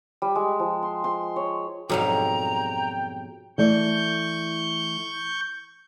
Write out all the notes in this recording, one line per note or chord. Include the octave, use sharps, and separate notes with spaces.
G3
G#3
F3
C6
C6
C#5
F2 G#2 B2 F#3 G3 G5 A#5
E3 A3 D5 C#6 G6